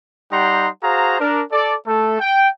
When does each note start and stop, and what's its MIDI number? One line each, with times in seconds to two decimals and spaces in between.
0.32 0.69 55
0.32 0.69 63
0.32 0.69 67
0.32 0.69 78
0.32 0.69 82
0.32 0.69 84
0.83 1.20 66
0.83 1.20 68
0.83 1.20 72
0.83 1.20 77
0.83 1.20 82
1.21 1.43 62
1.21 1.43 70
1.52 1.76 69
1.52 1.76 74
1.87 2.20 57
1.87 2.20 69
2.21 2.48 79